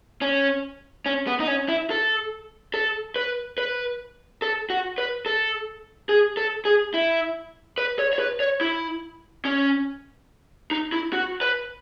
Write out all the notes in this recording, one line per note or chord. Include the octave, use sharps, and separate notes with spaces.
C#4
C#4
B3
D#4
C#4
E4
A4
A4
B4
B4
A4
F#4
B4
A4
G#4
A4
G#4
E4
B4
C#5
C#5
B4
C#5
E4
C#4
D#4
E4
F#4
B4